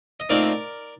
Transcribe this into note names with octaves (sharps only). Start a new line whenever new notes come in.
D#5
A#2 A3 C4 D#4 A#4 D5